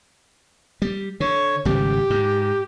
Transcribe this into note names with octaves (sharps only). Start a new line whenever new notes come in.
G3
D3 C#5
G#1 C#3 G3 G4
G#2